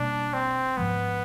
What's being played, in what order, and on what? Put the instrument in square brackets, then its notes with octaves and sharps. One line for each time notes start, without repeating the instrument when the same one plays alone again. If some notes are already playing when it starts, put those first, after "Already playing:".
Already playing: [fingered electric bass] B2 G3 A#3 C#4 [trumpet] D4
[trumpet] C4
[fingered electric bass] G#2 F3 G#3 [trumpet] B3